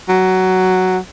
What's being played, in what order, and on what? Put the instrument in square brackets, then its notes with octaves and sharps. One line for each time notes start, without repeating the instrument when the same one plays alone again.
[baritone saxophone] F#3